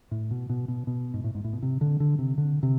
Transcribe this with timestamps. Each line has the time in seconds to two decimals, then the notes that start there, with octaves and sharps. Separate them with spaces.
0.11 A2
0.31 B2
0.49 B2
0.68 B2
0.87 B2
1.14 G#2
1.24 A2
1.35 G#2
1.44 A2
1.53 B2
1.62 C3
1.81 D3
2.00 D3
2.19 C3
2.38 D3
2.63 C3